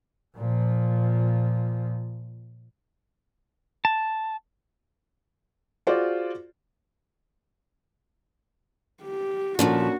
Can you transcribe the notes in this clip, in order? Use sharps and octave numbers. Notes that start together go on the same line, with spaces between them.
A#2 F3
A5
F4 F#4 G#4 C5 D5
G4
D2 A#2 F3 A#3 C#4 D4 F#4